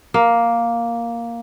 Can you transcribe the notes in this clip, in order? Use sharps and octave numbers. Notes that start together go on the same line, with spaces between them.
A#3